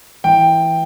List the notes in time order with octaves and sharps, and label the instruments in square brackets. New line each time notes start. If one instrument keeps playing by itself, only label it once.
[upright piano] E3 G5